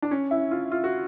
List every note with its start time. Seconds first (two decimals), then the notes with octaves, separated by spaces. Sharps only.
0.02 D4
0.11 C#4
0.31 E4
0.51 F4
0.72 F4
0.84 F#4